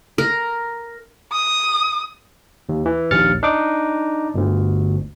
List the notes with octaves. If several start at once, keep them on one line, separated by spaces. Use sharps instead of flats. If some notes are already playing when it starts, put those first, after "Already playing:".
A#4
D#6
D#2
E3
A#1 D#2 F6 A6 C#7
D4 D#4 D6
G1 D2